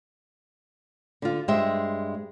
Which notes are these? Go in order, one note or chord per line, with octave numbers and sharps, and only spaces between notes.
D3 F4
G2 G#3 G4 C5 E5 G5